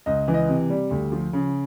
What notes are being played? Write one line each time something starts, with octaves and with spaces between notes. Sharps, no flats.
C#2 D#5
E3
D#5
C3
G3
D2
F3
C#3